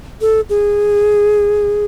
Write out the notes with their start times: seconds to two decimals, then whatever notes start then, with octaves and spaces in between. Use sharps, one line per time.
0.21 A4
0.50 G#4